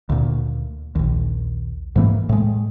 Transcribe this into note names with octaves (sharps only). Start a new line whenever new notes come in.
D2 A#2
A#1 D#2
G#2 E3 A#3
A2 G#3